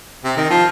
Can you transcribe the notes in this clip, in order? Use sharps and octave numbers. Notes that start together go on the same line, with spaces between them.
C3
D#3
F3